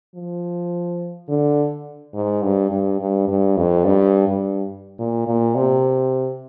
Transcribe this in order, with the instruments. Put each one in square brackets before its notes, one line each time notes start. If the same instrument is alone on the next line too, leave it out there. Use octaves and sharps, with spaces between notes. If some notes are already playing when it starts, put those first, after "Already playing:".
[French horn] F3
D3
G#2
G2
G2
G2
G2
F2
G2
G2
A#2
A#2
C3